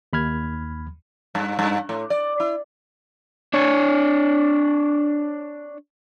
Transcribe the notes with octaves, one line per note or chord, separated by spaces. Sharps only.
D#2 B5 F6 G#6
G2
G2
A2
D5
E4
D4 C#5